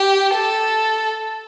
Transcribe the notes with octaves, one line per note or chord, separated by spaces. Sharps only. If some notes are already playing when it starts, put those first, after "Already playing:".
Already playing: G4
A4